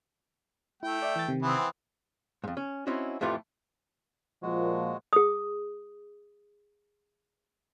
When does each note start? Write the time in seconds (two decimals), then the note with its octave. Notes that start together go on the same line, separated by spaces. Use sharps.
0.83 A3 E4 G5
1.02 D5 E5
1.16 E3 A6
1.28 C3 D#3
1.42 E3 B3 C4
2.44 F2 G#2
2.57 C#4
2.87 C4 C#4 D#4 E4 F#4
3.21 F2 A2 E3 A3 F4 G4
4.43 A#2 F3 G#3 F#4
5.13 G#4 D#6